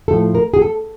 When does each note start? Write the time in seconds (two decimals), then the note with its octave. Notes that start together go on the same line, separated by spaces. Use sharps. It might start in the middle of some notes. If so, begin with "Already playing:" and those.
0.08 A2 F3 A3 A4
0.35 A#4
0.54 G#4
0.62 A4